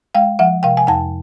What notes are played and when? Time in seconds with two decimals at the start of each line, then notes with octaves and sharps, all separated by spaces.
0.15 G#3 F5 G5
0.39 F3 E5 F#5
0.63 C3 F5 G5
0.77 G#5
0.87 F2 G5 A5